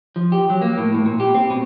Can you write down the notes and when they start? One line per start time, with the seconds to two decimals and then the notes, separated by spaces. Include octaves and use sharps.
0.16 F3
0.32 G4
0.50 F#3
0.62 A#3
0.78 A2
0.94 A2
1.06 A#2
1.20 G4
1.34 C4
1.50 B2